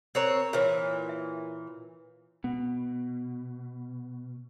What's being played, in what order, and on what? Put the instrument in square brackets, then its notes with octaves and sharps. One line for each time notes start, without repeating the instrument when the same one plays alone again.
[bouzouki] C4 C#5 [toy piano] A#4 C5 A#5
[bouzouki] A#2 E3 [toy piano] C#5 E5
[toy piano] E5
[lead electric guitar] B2 [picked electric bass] B3